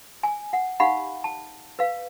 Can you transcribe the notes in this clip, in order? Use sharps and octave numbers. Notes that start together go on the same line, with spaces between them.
G#5
F#5
D#4 G4 F5 F#5 B5
A5
B4 F5